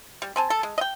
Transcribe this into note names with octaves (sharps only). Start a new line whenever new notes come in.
G3
C4 G#5 A5
A4
G#3
D#5 G5